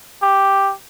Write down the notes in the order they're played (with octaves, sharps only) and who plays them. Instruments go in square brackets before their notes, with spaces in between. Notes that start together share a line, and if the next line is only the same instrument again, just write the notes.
[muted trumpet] G4